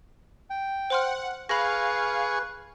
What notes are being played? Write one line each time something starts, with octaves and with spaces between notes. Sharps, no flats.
G5
C5 F#5 C6 F6
G#4 B4 F5 B5 C#6 A#6